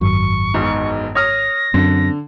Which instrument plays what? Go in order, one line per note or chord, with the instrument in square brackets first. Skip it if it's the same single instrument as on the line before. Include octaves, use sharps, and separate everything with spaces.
[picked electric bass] G#1 [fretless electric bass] F#2 [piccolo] C#6
[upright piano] E1 B1 G#2
[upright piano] C#5 D#6 F6 [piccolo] A#6
[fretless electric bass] F#2 [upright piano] D3 [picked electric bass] C4 C#4